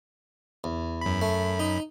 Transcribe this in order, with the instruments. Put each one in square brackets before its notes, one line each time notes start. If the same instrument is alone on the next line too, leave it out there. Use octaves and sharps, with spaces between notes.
[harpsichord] E2
[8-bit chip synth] F#2 B5
[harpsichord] A3
D#4